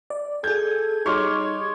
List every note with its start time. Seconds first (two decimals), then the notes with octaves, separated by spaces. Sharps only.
0.10 D5
0.44 G#4 A4 G6 G#6
1.06 G3 D#4 C#5 C6 D6 F6